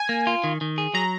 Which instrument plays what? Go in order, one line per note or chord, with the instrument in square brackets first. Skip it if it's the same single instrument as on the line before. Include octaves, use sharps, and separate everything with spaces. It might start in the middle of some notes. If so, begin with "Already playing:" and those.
Already playing: [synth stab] G#5
[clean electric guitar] A#3
F4
D#3
D#3
G#4
[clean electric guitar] F#3 [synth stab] A#5